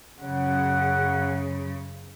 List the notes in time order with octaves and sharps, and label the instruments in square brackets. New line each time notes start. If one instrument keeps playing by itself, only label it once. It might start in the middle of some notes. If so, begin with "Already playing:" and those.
[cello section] F#2 C#3 [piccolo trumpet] F#5